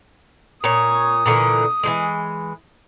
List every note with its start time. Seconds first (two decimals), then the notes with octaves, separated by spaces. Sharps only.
0.64 A#2 C#5 D#6
1.26 A#2 D3 E3
1.83 E3 F3 G#3